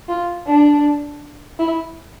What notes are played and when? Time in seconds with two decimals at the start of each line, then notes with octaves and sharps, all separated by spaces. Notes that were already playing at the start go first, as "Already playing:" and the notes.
0.09 F4
0.47 D4
1.59 E4